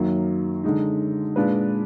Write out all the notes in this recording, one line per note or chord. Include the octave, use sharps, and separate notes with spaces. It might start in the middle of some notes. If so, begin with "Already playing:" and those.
Already playing: F#2 D#3 F#3 A#3
D3 G#3 D#4
A#2 G#3 D4 F4 B4